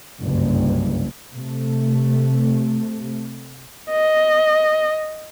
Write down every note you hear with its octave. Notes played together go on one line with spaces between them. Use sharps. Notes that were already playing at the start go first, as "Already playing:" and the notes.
F#1 C2 G2
C3 A3
D#5